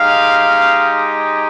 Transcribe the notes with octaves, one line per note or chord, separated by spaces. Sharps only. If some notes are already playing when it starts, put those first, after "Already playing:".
Already playing: G#3 D#4 G4 F5